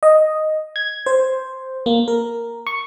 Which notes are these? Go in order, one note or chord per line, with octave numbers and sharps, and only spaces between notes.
D#5
G#6
C5
A#3
A#4
C#6